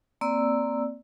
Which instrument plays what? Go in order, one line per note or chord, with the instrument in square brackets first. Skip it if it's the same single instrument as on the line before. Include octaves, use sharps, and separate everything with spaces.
[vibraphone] A#3 C4 D5 E6